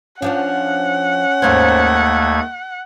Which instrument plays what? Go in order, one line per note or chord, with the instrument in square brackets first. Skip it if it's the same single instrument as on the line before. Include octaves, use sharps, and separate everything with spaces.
[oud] F3 D4 F#4 [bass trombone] C#4 [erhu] F#5
[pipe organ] D#2 A3 G#6 [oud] G#2 A#3 C5